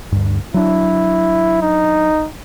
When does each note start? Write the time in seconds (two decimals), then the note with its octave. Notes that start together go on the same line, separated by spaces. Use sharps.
0.12 D2 G2
0.54 F#3 D4 E4
1.62 D#4